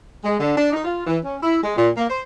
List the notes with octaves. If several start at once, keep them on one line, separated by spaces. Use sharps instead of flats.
G#3
D3
D4
D#4
F4
E3
C#4
E4
G#3
A#2
A#3
C5